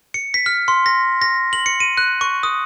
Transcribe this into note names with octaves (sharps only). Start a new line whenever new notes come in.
C#7
B6
F6
C6
A#6
A#6
F#7
C#7
D#7
F#6
C#6
D#6